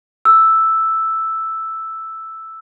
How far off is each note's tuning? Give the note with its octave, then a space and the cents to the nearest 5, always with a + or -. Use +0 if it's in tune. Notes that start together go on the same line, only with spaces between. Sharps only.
E6 +0